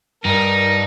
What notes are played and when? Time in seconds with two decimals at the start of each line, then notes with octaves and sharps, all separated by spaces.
0.25 G2 G3 D#4 A#4